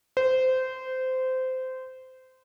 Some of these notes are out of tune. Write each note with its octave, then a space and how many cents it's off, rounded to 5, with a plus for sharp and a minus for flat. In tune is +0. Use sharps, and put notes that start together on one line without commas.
C5 -20